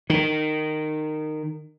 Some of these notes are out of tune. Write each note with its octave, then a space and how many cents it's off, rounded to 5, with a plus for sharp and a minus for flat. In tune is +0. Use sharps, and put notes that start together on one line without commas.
D#3 -15